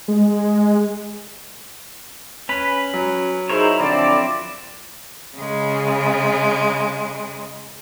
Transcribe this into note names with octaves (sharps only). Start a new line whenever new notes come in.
G#3
C#4 B4 B6
F#3
D#4 E4 G#4 A#4 C5 C#5
D3 F3 C4 E4 D5
C#3 G#3